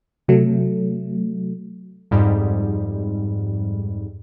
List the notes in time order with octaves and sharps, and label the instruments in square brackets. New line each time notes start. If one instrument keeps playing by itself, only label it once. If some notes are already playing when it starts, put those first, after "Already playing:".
[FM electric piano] C3 F#3 A3
[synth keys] F2 G#2 G3